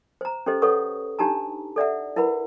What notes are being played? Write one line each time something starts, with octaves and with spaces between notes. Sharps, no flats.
C5 A#5
C#4 G4 A4 C5 D#5
A4 B4 C#5 F#5 C#6 D#6
D4 D#4 G4 A5 A#5
A4 D5 E5 F#5
E4 A#4 B4 F#5 B5